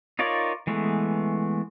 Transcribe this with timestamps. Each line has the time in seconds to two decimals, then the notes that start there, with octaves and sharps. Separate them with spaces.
0.19 D#4 F4 A#4 C#5 D5
0.67 E3 G#3 A3 B3